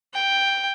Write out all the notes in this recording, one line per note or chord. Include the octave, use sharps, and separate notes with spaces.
G5